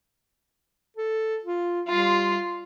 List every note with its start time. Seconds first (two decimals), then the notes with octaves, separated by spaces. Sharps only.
0.97 A4
1.44 F4
1.89 G3 F4 C6